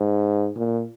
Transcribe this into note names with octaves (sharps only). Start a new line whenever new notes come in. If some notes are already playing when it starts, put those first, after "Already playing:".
Already playing: G#2
A#2